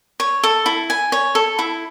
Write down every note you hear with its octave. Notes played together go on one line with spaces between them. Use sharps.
C#5
A4
E4
G#5
C#5
A4
E4